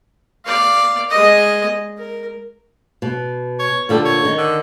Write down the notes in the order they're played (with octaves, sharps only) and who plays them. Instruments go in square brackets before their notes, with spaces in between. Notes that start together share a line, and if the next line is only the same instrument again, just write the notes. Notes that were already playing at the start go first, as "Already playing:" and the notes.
[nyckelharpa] D5 F5
G#3 D#5
A#4
[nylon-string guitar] B2
[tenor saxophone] C#5
[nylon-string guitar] A#2 D3 A4 [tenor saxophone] G3
[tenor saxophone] C#5
[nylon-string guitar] D#3
[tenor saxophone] D3